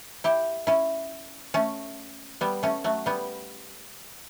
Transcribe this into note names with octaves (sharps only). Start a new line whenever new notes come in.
E4 G4
C#4 E4
A3 C#4
G3 B3
A3 C#4
F#3 A3
G3 B3